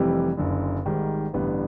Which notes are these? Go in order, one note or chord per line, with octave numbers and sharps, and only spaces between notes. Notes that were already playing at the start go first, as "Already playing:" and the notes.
Already playing: F1 F2 C3 E3 G3
F#1 F#2 D3
G#1 G#2 D#3 G3
A1 G2 D3 G3 B3